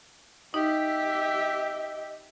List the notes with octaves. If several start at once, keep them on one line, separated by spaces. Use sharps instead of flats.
D#4 G4 D#5 E5